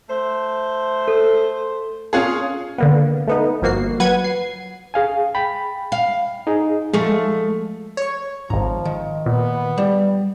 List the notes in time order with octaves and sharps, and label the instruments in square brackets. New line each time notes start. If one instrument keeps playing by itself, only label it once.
[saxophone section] A3 C5
[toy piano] A4
[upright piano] C#4 F4 G#4
[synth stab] D3 A#3 B3
A3 B3 D#4
G1 F3 A#3 F#4 C7
F#3 B4 F#5 G#6 D#7
C7
[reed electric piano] G#4 F5 G#5
G5 B5
[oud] F5
[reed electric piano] D#4 G#4
[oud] F3 A3 [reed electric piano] G#3
[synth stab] C#5 C#6
[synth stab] G#1 G#2 [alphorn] F3 [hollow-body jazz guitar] A#5
[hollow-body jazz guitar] D#3
[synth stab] A#2 [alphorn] B3
[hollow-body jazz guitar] G3